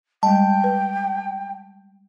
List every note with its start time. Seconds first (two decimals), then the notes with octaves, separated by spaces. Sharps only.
0.23 G3 G#3 G5 A5
0.64 B4